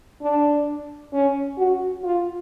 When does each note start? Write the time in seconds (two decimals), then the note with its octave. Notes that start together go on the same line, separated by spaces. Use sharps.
0.22 D4
1.13 C#4
1.58 F#4
2.03 F4